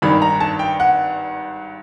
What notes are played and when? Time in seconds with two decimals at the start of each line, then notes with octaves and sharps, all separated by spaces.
0.02 G#1 G2 D#3 B5
0.22 A#5
0.40 A5
0.59 G5
0.80 F#5